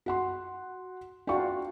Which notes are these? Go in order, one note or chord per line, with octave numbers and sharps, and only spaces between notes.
F#4 F#5 C6
D4 F4 F#4 G5 C#6